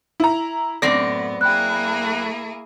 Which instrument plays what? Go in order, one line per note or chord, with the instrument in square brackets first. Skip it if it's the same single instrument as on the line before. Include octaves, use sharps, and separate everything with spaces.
[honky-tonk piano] E4 A#5
[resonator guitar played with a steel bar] F#2 C4 D5 [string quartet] A2 B3 [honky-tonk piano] A#6
[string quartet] A#3 E4 G#4 [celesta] G5 B5 F#6